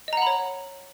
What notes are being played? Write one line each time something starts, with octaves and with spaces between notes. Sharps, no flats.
C#5 D#5 F#5 A#5 B5